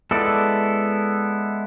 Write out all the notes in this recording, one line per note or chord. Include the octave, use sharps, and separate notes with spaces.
G#3 B3 E4 A4 D5